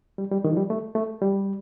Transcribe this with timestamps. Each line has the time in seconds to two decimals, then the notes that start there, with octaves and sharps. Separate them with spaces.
0.18 G3
0.32 G3
0.44 D#3
0.53 F3
0.57 G3
0.70 A3
0.95 A3
1.21 G3